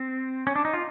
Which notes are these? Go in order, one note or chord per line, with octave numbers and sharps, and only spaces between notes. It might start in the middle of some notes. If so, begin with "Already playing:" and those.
Already playing: C4
C#4
D4
D#4
F4